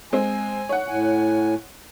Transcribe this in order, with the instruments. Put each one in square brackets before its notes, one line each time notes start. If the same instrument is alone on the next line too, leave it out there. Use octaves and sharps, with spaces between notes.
[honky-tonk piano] G#3 C4 [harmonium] G#5
[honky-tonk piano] C#5 F#5
[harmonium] A2 G#5